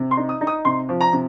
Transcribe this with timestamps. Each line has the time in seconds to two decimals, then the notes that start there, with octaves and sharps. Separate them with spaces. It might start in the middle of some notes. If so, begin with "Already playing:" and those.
Already playing: C3
0.11 C6
0.17 D#4
0.29 D#6
0.41 D#4
0.47 D#6
0.65 C3 C6
0.89 F3
1.01 A#5
1.13 C3